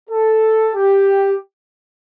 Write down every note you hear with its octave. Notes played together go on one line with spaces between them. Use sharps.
A4
G4